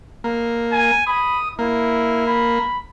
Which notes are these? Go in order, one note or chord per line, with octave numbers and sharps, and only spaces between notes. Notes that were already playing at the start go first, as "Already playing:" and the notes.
A#3
G#5
B5 D#6
A#3 E4
B5